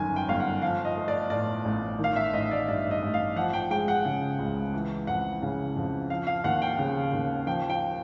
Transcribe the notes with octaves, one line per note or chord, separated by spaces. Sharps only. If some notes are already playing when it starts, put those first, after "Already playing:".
Already playing: G1 F#2 D#3 G#5
G5
G1 F5
F#5
F3 F5
D#5
A3
D5
A2 D5
A1
D#3 F5
E5
A1 D#5
D5
G2 D5
D#5
A1
F5
F3 F#5
G5
G#3 G5
F#5
C#3
C#2
E3
F2 F#5
C#3
F2
F3 F5
F5
D#2 F#5
G5
C#3
D#2
F3 G5
G5